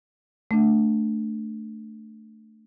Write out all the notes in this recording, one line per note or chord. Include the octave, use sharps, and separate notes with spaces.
A3 D4